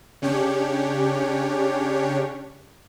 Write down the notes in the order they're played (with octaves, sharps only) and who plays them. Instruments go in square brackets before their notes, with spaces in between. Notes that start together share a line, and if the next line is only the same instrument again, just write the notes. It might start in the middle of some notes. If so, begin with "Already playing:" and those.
[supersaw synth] C#3 C#4 D4 G4 C#5